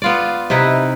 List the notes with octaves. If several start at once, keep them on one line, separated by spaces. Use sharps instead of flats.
B3 F4 D5
C3 D#4 E4 B4